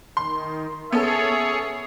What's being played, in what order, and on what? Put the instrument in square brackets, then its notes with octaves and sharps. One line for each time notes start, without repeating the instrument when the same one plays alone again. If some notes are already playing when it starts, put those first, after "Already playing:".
[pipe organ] D#3 [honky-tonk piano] C6
[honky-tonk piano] B3 C#4 A4 [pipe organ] G#4 C#5 [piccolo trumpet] E5